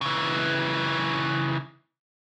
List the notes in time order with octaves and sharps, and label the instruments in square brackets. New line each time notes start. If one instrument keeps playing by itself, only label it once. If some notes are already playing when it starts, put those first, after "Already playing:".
[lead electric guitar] C#3 E3